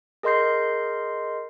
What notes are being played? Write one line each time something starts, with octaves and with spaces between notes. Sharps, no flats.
G#4 A#4 D#5 C6 G6 C7